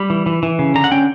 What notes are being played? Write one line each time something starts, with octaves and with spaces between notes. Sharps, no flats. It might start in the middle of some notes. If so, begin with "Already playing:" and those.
Already playing: G3 B5
E3
E3
E3
C#3
D3 A#5
F#5
C#4 G5